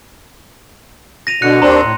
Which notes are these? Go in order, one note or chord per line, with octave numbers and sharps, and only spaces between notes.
A#6 D#7 F7
B2 D3 F#6 C#7
D#2 C4 D4 A#5 C6
A2